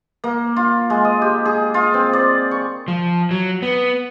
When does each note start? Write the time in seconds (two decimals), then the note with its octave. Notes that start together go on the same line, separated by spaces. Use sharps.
0.24 A#3
0.56 F4
0.90 G#3
1.05 D#5
1.22 G4
1.45 G#4
1.74 F4
1.94 C4
2.13 D5
2.51 C#6
2.88 F3
3.31 F#3
3.62 B3